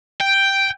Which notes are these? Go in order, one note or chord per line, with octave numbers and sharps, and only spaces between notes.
G5